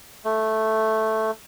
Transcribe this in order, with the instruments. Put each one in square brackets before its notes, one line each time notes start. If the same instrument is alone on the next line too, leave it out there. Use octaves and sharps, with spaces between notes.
[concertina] A3